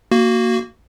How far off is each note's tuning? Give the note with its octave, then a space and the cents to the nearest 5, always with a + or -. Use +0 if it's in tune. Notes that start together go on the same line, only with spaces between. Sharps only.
A#3 -10 F#4 +0